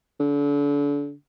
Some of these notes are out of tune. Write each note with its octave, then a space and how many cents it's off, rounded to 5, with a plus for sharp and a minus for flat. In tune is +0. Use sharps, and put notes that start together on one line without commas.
D3 -35